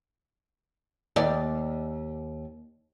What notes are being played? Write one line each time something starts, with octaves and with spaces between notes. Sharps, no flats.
D#2 D5